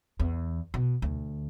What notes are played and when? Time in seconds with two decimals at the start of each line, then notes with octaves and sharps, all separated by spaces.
0.20 E2
0.74 B2
1.02 D2